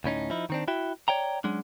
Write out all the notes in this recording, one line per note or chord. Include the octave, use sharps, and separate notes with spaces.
D2 A2 C#4 D#4
F3 D#4 E4
D#3 C4 D4
E4 F#4 E5 G5
C#5 D5 G5 A#5
F#3 G#3 C#4 D4